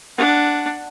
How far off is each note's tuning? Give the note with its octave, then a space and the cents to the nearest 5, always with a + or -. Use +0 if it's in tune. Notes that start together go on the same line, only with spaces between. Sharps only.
D4 +0 F#5 +0